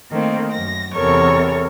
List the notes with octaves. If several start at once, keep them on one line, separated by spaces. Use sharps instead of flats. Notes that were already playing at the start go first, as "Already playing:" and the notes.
D#3 A3 A#3 C4
F#2 A#6
E2 C3 A4 A#4 C#5 C#6